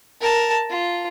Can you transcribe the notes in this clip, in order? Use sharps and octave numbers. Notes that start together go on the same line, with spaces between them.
A#4 A5
F4